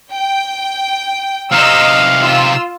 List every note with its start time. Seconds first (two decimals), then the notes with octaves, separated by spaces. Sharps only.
0.12 G5
1.52 C3 D#4 D#5 F5 E6
2.22 F4 E6